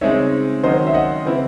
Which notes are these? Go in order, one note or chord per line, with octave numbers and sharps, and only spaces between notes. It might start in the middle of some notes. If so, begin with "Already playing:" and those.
C#3 G#3 C4 D#4 C#5 E5
D#3 F#3 C#4 C5 D#5
E5
D#5 F#5
C#3 E3 C4 E4